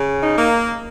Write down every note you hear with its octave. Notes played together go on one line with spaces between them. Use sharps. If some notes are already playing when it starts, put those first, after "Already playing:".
Already playing: C#3
D#4
A#3